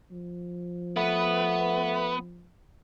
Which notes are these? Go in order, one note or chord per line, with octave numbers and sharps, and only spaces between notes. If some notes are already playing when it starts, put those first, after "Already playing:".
F3
A3 B3 B4